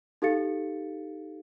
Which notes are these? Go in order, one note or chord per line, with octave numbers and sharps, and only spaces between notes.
D#4 G4 A4 F5 A6 C#7